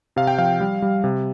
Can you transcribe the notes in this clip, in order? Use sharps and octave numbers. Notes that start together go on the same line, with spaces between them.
C3 F5
G5
F3 F5
G3
G3
C3